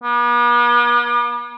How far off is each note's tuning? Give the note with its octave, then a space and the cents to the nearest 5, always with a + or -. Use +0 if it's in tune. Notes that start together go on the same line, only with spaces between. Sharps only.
B3 -45